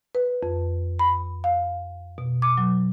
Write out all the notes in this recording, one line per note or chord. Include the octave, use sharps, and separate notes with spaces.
B4
F2
B5
F5
B2
D6
F#3